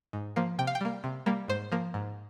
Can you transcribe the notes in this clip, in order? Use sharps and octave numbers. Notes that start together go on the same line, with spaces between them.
G#2
F3 A#3
C3 G5
F5
G5
G3 A#3
C3
G3 A#3
G#2 C5
F3 A#3
G#2